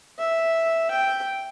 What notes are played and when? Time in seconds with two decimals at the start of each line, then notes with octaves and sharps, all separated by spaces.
0.19 E5
0.91 G5